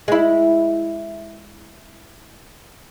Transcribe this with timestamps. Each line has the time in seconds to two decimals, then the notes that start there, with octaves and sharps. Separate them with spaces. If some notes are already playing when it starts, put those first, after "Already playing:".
0.08 G#3 E4